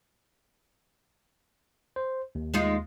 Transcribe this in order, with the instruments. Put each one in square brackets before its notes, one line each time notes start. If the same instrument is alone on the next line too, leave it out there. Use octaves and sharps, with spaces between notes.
[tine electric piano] C5
D#2
[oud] G#3 D#4 F4